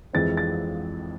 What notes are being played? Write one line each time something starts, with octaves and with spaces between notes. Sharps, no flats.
F2 E3 G#3 C4 A6
A6